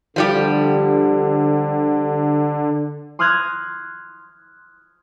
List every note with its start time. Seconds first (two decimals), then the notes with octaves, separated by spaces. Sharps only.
0.16 D3 F3 G3 G4
3.19 C6 D#6 F6 F#6 G#6 A#6